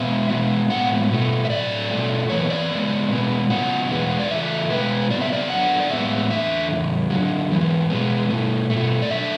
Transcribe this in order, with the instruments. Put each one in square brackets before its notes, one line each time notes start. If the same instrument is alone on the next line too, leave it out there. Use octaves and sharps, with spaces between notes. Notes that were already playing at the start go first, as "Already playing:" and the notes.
Already playing: [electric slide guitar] B2 G#3 B3 E5
B2 G#3 B3
A2 G#3 B3 F#5
B2 A3
E5
A2 F#3 A3 D5
B2 A3
F#2 E3 B3 C#5
D5
C#3 G#3 B3
B2 G#3 B3
C#3 F#3 B3 F#5
E2 B2 G#3 B3
D5
C#3 E3 A3 E5
B2 G#3 B3 B4
C#3 F#3 B3 D5
E5
D5
F#2 D3 F#3 B3 F#5
D5
A2 G#3 B3 E5
E2 D3 A3 E5
E2 C#3
F#2 D3 F#3
G#2 E3 B3
B2 G#3 B3
B2 A3
B2 A3
D5
F#2 D3 A3 E5